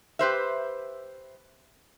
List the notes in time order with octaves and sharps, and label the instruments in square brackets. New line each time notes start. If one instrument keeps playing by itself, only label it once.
[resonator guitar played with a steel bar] G4 B4 C5 E5